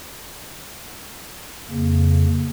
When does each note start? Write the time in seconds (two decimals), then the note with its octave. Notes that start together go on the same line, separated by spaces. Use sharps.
1.69 F2 C#3 A#3